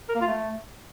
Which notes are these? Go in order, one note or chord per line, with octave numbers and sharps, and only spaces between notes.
A#4
A#3
F4
A3